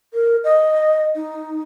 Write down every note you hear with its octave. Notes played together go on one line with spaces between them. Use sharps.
A#4
D#5
D#4